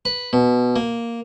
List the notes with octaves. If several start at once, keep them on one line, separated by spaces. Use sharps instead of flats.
B4
B2
A#3